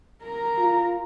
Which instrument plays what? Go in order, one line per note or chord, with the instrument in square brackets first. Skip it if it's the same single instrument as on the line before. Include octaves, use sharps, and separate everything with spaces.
[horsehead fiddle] A#4 A#5
[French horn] F4